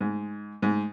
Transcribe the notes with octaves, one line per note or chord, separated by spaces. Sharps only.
G#2
G#2